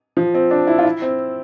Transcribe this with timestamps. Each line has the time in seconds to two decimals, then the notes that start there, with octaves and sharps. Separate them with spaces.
0.17 F3
0.34 C4
0.51 D4
0.67 E4
0.79 F4
0.85 E4
1.02 C4